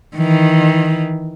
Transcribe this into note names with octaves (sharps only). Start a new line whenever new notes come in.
D#3 E3